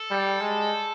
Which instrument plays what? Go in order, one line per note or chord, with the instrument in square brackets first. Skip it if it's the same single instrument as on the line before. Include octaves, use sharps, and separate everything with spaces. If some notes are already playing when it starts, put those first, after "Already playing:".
Already playing: [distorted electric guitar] A4
[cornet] G3
G#3